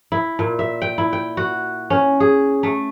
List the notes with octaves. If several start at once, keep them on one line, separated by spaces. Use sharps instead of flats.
E4
A#2
E5
G5
E4
G5
F#4
C#4
G#4
A3